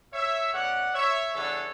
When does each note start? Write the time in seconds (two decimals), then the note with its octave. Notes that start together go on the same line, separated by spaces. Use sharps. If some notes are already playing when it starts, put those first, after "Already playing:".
0.13 C#5 E5
0.53 B2 A3 C#4 D5 F#5
0.94 C#5 E5
1.35 C#3 E3 G3 B3 D4 A4 C#5